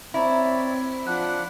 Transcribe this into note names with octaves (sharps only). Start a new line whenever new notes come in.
C4 E4 C#5 D5 A#5 B5
F3 D4 F#5 F#6